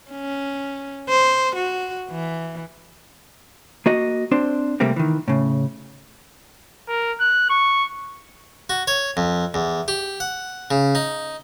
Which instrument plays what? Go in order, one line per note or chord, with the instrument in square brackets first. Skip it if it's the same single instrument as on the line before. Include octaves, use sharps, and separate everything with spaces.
[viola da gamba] C#4
C5
F#4
E3
[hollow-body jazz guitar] A#3 F#4 D#5
C4 D4 C5
C3 G3 A3 A#3 C4
D#3 E3
A2 C#3
[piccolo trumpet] A#4
F#6
C#6
[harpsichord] F#4
C#5
F2
E2
G4
F#5
C#3
D#4